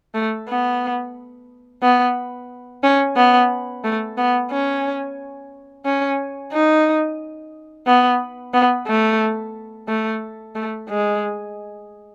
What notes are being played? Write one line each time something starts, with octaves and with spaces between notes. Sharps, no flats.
A3
B3
B3
C#4
B3
A3
B3
C#4
C#4
D#4
B3
B3
A3
A3
A3
G#3